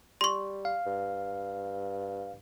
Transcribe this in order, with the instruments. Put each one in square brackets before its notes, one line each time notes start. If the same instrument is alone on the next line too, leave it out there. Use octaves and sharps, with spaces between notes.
[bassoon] G3 [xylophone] C6 C#6
[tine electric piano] F5
[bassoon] G2